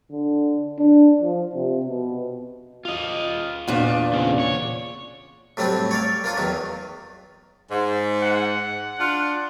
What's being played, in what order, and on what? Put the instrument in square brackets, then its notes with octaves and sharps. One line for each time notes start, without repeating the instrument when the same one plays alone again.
[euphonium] D3
D4
F3
C3
B2
[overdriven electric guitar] F4 D#5
[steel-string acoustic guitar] E2 A#2 D4
[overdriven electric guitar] C#3 C4
C#5
[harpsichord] A2 F#3 G3 C4 D4
C#5 D5 F5
A#3 D4 F4
E2 D#3 F#3
[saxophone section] G#2
[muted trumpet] F#5
[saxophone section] D4 F4